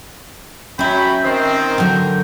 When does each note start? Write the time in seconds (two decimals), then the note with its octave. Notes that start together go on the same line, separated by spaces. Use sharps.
0.79 F#3 C#4 E5 G5 B5
1.24 D#3 C4 C5
1.78 D3 F#3 A#4 G5